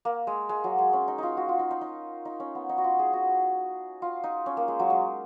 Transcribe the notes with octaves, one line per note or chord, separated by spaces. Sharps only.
A#3
G#3
G#3
F#3
G#3
C#4
D#4
D#4 F4
F#4
F4
D#4
D#4
D#4
D#4
C#4
B3
D#4
F#4
F4
G#4
F#4
F4
D#4
C#4
A#3
G#3
F#3
G#3